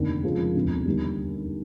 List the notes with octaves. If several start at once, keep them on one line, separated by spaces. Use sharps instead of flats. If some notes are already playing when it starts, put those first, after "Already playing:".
Already playing: F1 D#2 D3
F1 F2 C#3 F3 G#3
E1 D2 C3
D#2 D3 G3